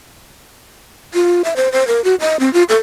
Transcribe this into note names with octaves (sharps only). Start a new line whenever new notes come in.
F4
E5
C5
C5
A#4
F#4
D#5
C4
F4
A4